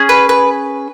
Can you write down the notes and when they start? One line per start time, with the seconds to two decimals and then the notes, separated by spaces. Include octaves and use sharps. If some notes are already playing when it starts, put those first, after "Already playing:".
Already playing: C#4 G#4
0.09 B4
0.29 B4